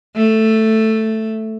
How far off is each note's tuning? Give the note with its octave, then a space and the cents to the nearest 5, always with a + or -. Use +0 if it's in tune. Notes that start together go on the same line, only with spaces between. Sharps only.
A3 +5